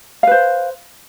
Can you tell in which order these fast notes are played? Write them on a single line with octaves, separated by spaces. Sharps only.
F5 B4 C5